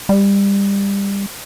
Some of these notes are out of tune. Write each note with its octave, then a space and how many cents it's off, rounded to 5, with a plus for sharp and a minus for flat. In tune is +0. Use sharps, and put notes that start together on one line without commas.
G3 +25